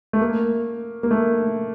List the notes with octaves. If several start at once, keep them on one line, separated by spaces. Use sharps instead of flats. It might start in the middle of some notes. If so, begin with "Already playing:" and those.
A3
A#3
A#3
A3